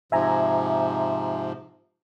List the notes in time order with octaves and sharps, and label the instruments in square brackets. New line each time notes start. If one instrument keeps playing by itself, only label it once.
[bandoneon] G#2 C3 F3 [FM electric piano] E5 G#5 A#5